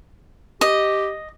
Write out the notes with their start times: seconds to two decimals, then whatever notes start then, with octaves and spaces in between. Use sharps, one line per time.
0.61 G4 D#5